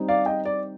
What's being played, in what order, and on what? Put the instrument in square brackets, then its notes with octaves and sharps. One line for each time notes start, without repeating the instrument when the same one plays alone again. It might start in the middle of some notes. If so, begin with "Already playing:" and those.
Already playing: [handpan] G3 C4 D#4
[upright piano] D5 F5
D#5 G5
D5